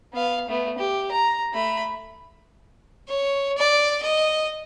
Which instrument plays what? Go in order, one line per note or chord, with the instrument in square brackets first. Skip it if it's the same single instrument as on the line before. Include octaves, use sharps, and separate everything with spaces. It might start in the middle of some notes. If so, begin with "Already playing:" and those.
[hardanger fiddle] B3 F5
A3 B3
G4
A#5
A3 B5
[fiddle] C#5
D5
D#5